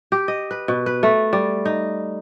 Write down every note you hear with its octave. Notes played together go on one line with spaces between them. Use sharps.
G4
D#5
B4
B2
B4
A3
G3
D#4